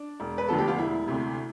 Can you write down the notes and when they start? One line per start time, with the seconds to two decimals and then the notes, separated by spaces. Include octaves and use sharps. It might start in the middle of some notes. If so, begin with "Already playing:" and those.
Already playing: D4
0.20 E1
0.38 B4
0.48 D2 D3 F3 B3 A4
0.58 G4
0.68 F4
0.78 E1 E4
1.08 D2 C3